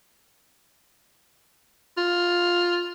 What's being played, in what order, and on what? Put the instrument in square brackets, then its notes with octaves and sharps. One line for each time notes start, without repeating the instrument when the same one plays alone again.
[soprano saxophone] F4